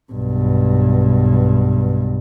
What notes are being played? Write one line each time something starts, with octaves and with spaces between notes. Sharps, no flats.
B1 G2